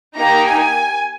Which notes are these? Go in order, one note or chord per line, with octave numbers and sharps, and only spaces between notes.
A#3 D#4 G4 A#5
G#5